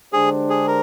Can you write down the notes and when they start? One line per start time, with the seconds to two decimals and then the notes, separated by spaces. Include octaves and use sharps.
0.13 D3 G#3 D4 G4 G#4 C5
0.50 G#4
0.67 A#4